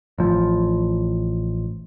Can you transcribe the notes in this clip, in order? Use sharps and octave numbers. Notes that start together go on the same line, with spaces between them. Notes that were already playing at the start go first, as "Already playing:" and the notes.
A1 F3